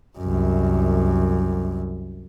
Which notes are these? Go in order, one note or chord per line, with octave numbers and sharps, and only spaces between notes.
C2 F#2